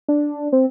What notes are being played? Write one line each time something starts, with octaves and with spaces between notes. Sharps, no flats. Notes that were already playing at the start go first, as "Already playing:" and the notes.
D4
C4